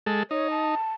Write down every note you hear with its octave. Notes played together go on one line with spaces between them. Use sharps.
G#3 A4
D#4 C#5
A5